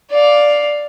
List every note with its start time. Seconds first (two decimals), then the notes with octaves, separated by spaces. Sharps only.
0.11 D5 F5